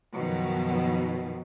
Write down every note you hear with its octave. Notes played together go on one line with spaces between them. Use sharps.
F#2 B2 D#3 F3 F#3